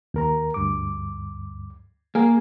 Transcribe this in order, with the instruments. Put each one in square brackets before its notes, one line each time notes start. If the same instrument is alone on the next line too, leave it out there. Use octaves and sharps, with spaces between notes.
[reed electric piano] D#2 A#4 A#5
D2 G2 D6
[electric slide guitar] A#3 [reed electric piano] G#4 A#4 G#5